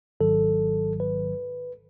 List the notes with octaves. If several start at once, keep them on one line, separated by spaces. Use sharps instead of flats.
G#1 G#2 D#3 F#3 A4
B4